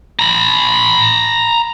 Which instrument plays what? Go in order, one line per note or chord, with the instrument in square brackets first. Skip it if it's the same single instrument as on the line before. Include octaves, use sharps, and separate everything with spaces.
[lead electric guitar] A#5 B5